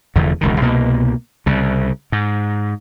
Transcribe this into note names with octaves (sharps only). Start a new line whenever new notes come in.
F1 E2 D3
E1 C#2 D#3
C2 B2 A#3
C2 C#3
G#2